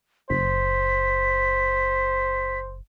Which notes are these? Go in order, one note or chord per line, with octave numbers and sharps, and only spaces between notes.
F#1 C5 B6